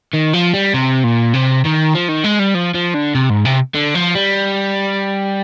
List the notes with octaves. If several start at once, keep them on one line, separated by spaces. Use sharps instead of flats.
D#3
F3
G3
C3
A#2
C3
D#3
F3
D#3
G#3
G3
F3
F3
D3
C3
G#2
C3
D3
F3
G3